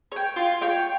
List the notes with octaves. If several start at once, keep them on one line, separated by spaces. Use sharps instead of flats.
C#5 G5
F4
C#5 G5